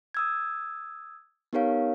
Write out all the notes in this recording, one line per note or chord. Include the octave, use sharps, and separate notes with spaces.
D#6 E6 G#6
B3 D#4 G4 A#4 C#5 F5